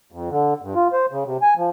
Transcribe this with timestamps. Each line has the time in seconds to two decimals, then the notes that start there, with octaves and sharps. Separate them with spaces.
0.12 F2
0.30 D3
0.62 G2
0.75 F4
0.93 C5
1.11 C#3
1.26 C3
1.42 G#5
1.57 F3